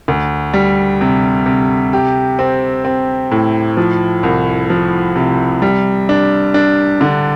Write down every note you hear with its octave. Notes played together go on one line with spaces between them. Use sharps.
D2
G3
C3
C3
G4
C4
C4
A2
F3
C2
F3
C3
G3
D4
D4
D3